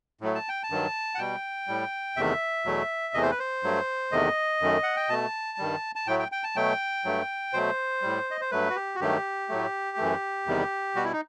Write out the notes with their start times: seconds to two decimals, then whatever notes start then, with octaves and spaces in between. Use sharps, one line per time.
0.21 A2 F#3 A3
0.35 A5
0.49 G5
0.63 A5
0.70 G2 D#3 F#3
1.15 F#5
1.19 B2 G3 G5
1.68 A2 G3
2.16 E2 C3 D#3 A3 E5
2.65 E2 B2 F#3 A3
3.14 E2 C3 E3 A3 D#5
3.22 C5
3.31 B4
3.39 C5
3.63 G2 F#3 A3
4.12 E2 C3 D#3 A3 D#5
4.61 F#2 D#3 A3
4.83 F#5
4.96 G5
5.09 B2 A3 A5
5.58 G2 D#3 G3
5.95 A5
6.07 A2 F#3 A3 G5
6.19 G5
6.32 G5
6.44 A5
6.56 B2 F#3 A3 G5
7.05 G2 F#3 A3
7.53 B2 F#3 A3 C5
8.02 A2 G3
8.31 D#5
8.41 C5
8.51 G2 F#3 A3 B4
8.70 F#4
8.76 G4
8.95 F#4
9.00 G2 D#3 F#3 A3 G4
9.49 A2 F#3 A3
9.97 F#2 E3 A3
10.47 E2 C3 D#3 G3
10.95 B2 G3 F#4
11.04 E4
11.13 D#4